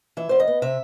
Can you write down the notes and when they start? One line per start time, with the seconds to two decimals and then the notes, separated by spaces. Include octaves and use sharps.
0.17 E3 E5
0.29 E2 C5
0.40 D#5
0.48 B3
0.62 C3 E5